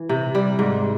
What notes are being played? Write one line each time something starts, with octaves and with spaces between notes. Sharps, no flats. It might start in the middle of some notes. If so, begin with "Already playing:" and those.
Already playing: E3
C3
G3
G#2